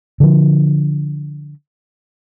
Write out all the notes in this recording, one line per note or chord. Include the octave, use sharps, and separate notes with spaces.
D3 F3